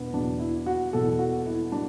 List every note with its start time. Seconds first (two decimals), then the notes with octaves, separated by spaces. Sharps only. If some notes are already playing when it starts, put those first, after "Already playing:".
Already playing: E2 B2 B3 D4
0.13 E2 B2 F#3 D4
0.39 E4
0.66 F#4
0.92 E2 B2 F#3 A4
1.19 F#4
1.46 E4
1.72 F#3 D4